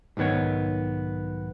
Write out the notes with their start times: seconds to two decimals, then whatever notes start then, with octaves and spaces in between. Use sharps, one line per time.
0.17 B1 G#2 D#3 B3 C#5